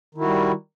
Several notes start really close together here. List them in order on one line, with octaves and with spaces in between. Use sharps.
D#3 E4 F#4 G3